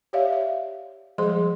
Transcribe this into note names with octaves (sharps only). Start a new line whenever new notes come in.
G4 C#5 D5 E5 F5
E5
F3 G3 G#3 G#4 C5 C6